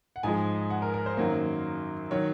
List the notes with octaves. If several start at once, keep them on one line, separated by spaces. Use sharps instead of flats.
F#5
G#2 F3 G#3 G#5
F#5
A#4
A#4
C5
F#2 D#3 F#3 A#3
D#3 F#3 C#5